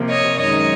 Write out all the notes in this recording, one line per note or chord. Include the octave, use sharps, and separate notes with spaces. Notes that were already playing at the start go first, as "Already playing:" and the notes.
Already playing: C3 F3 A#3
C#5 D#5
F#2 D#3 G#3 C#5 D#5